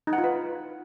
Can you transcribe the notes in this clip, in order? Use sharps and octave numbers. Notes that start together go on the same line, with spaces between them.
D#4
F#5
F4
B4